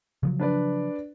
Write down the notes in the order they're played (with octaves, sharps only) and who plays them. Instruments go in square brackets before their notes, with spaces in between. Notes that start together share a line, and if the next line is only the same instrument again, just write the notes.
[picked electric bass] C#3 F3 F#3
[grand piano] D4 B4 D5